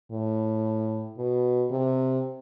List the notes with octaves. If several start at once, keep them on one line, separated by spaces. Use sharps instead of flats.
A2
B2
C3